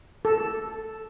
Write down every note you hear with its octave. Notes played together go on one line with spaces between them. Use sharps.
A4